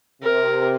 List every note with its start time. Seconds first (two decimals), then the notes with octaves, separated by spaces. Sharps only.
0.23 C3 A#4